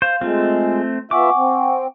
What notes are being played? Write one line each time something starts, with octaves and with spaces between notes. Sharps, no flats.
C5 F5
G#3 A3 C4 F4
B3 F4 E5 F#5 G#5 C#6 D6
C4